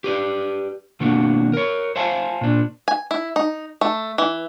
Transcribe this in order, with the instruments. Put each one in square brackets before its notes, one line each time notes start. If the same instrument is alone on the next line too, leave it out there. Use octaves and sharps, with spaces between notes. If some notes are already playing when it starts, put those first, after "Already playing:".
[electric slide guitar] G4 B4 D5
B2 D#3 A#3 D4 F#4
A#4 C#5
C5 E5 F5 G#5 A5
A#2 D4
[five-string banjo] G#5
E4
D#4
A3
E3